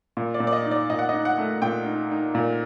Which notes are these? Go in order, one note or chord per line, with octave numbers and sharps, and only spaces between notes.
A#2
D5
A#2
D5
D#5
D#4
D5
A#2 D#5
F#5
D#4 D#5
F#5
A3
A#2 G5
D#4
D#4
A#2